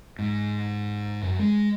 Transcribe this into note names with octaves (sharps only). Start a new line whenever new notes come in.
G#2
F#2
G#3